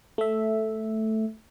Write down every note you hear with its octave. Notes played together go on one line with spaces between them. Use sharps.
A3 E5